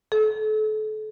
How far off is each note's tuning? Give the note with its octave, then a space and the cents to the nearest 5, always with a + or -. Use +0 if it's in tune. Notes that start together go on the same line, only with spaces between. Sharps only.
A4 -35